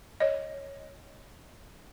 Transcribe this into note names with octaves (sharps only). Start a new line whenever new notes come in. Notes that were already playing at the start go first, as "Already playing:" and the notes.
C#5 D#5